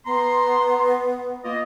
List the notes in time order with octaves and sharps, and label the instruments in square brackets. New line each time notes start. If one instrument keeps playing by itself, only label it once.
[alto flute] B3 [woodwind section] A#5 C6
[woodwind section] A#3 F4 D#5